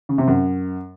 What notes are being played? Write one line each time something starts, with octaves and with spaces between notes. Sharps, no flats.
C#3
C3
F#2